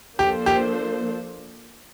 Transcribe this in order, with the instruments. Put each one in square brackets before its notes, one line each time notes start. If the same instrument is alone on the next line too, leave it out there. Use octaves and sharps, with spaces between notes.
[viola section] F3 A#3 D4 A4 C5 [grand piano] G4
[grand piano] G4